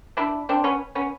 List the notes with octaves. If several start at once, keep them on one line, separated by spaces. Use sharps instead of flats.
D4 E4
C4 D4
B3 C#4
B3 C#4